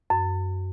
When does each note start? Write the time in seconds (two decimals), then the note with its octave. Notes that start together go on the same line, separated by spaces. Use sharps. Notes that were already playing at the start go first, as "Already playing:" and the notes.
0.10 F#2